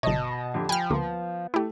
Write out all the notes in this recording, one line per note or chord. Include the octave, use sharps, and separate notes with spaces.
G1 B2 C#5 D#5 A5
F2 D3 G4
F3 G5 G#5 B5 F6
D2 A#3 B3
A3 E4 G4